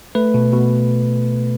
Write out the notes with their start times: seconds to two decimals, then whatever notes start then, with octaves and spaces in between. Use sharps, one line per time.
0.15 A3 B4
0.34 B2
0.53 B2